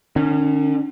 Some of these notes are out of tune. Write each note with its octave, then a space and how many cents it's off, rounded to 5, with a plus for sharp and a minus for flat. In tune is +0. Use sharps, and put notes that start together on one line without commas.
D#3 -45 C#4 -5